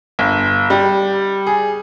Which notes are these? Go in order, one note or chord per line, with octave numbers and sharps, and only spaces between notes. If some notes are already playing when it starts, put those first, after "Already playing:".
G1
G3
G#4